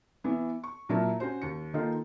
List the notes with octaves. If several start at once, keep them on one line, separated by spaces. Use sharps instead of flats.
E3 B3
C#6
A#2 F#3 A#3 E4 A#4 A5
C#4 F#4 C5
D#2 C#7
D#3 A#3 D#4 F4 A4